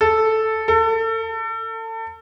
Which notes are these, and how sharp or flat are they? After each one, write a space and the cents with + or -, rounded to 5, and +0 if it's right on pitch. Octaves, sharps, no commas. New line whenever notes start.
A4 +0
A4 +35